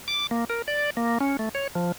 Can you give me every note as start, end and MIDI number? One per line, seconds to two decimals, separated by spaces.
0.08 0.27 86
0.31 0.45 58
0.50 0.62 70
0.68 0.90 74
0.97 1.18 58
1.20 1.37 61
1.39 1.49 57
1.55 1.67 73
1.75 1.92 53